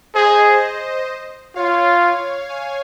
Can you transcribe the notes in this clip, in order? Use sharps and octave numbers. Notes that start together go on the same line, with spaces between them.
G#4 C5 D#5
F4 C#5 F5
F5 G#5